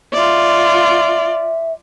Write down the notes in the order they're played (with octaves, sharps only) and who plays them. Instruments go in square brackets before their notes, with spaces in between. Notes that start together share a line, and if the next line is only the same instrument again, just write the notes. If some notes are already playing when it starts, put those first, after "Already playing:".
[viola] F4 D5 [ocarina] E5